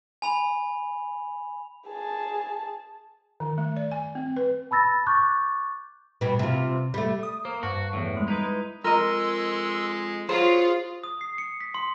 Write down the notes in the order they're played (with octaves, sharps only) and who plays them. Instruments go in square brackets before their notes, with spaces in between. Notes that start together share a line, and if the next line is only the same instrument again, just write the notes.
[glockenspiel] G#5 B5 F7
[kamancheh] G#4 A5
[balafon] D#3
A3
D5
G#5
C4
B4
[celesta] A5 B5 E6 A6 A#6
C#6 D6 F#6 G6 A6
[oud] B2 G3
C3 F4
G3 A3
[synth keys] D#6
[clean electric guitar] A#3 [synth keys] C5
[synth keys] G2 A5 [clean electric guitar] F#4
[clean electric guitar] E2 A2
[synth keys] G3 G#3
[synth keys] G#3 E4 B4 [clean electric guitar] D#4
[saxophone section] F2 G#3 [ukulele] A#4 D#5 [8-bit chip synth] C6 E6
[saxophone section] F#3 [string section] F4 [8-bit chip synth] G#4 [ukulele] C5
[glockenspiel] D#6
C7
C#7
B6
C6